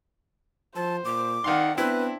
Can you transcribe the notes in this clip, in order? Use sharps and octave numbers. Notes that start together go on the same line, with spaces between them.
F3 C5 A5
A#2 D6
D#3 D#4 D5 F5 F#5 C6
B3 C4 D4 E4 B4